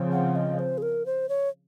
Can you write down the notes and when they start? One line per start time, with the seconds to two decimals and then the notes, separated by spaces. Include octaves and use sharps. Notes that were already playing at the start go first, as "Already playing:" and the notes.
Already playing: C#3 F3 C4
0.12 F#5
0.36 D#5
0.59 C5
0.78 G#4
0.82 A#4
1.06 C5
1.29 C#5